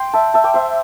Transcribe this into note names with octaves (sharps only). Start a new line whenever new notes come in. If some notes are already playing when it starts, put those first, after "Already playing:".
Already playing: G5 C6
E5 A5
E5 A5
D5 G5
C5 E5